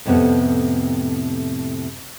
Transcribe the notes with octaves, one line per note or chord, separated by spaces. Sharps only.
F2 A2 C3 A3 B3